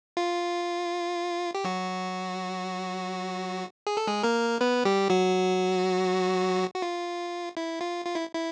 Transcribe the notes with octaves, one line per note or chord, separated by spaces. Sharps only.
F4
G4
F#3 F#4
G#4
A4
G#3 G#4
A#3 A#4
B3 B4
G3 G4
F#3 F#4
F#4
F4
E4
F4
F4
E4
E4